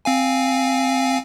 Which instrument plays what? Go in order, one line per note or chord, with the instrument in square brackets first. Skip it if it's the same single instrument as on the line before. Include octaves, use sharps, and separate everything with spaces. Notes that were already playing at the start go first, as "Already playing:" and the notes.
[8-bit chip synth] C4 F5 G#5